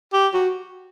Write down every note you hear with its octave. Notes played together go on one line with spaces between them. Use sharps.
G4
F#4